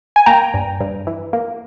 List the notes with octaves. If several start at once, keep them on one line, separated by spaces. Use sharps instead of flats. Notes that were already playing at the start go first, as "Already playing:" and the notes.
G#5
A#3 G5 A#5
G2
G2
E3
A#3